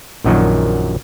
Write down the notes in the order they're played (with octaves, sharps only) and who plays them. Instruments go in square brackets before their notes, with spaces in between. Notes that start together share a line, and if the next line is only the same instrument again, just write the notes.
[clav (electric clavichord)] A#1 F#2 A#2 D#3 F#3